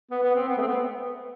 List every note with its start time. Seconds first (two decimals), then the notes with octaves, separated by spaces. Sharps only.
0.11 B3
0.23 B3
0.35 C4
0.48 B3
0.57 A3
0.62 C4
0.67 B3